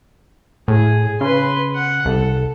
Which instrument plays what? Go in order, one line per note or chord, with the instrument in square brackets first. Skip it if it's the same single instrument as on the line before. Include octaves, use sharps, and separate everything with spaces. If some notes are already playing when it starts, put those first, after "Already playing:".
[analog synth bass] A2 [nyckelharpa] G#4
[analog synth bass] C#3 [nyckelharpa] B4 C6
[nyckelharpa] F#5
[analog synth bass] C2 [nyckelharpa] A4